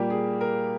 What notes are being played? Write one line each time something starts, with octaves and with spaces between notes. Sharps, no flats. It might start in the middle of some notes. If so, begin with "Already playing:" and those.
Already playing: A#2 G3 A#3 G4
G#4
A#4